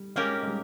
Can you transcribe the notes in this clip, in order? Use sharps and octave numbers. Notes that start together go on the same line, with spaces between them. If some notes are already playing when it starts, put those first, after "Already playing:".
Already playing: G3
G#3 A#3 C#4 G4 A#4
G#3
G3